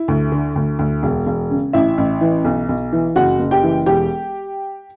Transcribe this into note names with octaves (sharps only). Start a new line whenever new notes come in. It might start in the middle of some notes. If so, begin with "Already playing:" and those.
Already playing: E4
D2
D3
D2
D2
E1
E1
C#3
A1 E4 E5
A1
E3
B1
B1
E3
F#1 F#4 F#5
F#1
G4 G5
E3
E1 G4 G5